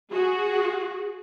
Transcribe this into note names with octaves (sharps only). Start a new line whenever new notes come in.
F#4 G#4